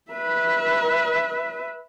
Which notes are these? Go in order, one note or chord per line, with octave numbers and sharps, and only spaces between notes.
B4 E5